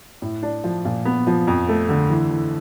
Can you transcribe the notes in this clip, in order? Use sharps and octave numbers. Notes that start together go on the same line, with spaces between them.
A2
D4
F3
A#2
B3
F3
F2
A3
D3
E3
E3